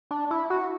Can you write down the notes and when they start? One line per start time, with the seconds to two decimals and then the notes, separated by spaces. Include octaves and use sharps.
0.11 D4
0.31 E4
0.50 F#4